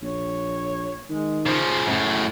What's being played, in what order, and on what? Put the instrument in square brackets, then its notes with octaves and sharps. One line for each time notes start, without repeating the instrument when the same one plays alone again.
[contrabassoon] A#1 [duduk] C#5
[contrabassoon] D#3 [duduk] G#3
[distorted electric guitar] C#3 F3 [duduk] C5
[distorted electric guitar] F#2 A2 [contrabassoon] C#3